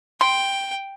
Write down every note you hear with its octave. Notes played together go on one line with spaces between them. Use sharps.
G5 C6